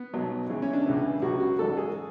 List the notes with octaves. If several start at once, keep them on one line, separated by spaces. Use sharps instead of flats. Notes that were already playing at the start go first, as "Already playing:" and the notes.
Already playing: B3
B1 B2 F#3
E2 C#3 E3
C#4
D4
C#2 C#3 E3
C#2 C#3 F#3 F#4
F#4
A1 G#2 F#3 A4
G#4